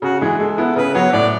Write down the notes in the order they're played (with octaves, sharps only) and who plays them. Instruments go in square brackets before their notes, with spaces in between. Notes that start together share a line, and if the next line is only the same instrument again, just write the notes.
[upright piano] C#3 [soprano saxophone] F#4
[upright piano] E3 G#3 [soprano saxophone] G#4
[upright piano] G#3 [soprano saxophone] A4
[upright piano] B3 E4
[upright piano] C#3 [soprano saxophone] B4
[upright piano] F#3 B3 F#4 [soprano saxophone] C#5
[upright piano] A2 [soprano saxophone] D5